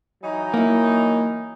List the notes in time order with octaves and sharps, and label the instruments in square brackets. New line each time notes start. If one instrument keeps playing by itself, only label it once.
[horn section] E3 F#3 D#4
[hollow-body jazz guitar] A#3 E4